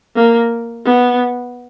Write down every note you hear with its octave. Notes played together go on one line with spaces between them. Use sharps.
A#3
B3